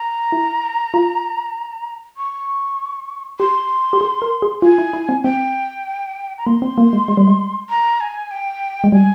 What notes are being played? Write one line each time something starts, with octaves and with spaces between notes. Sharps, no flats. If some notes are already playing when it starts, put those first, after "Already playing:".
Already playing: A#5
E4
F4
C#6
G4 C6
G4
G#4
A#4
G#4
F4 G#5
E4
E4
C4
C4 G5
A#5
A#3 C6
C4
A#3
G#3
G#3
G3
G#3
A#5
G#5
G5
G#3
G3 G#5